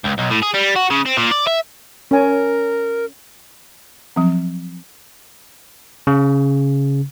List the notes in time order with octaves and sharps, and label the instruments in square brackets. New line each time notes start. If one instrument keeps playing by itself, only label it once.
[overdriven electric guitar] C#2
B1
A2
G#4
G3
F#4
C#3
C4
A#2
D5
E5
[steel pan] C#4 G#5 [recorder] A#4
[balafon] F3 F#3 C4
[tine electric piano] C#3